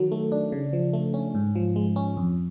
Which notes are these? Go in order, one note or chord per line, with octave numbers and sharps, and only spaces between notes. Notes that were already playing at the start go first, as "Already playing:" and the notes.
Already playing: D#3 F#3
A3
D4
C#3
F3
A3
C#4
G#2
F3
G#3
C#4
F2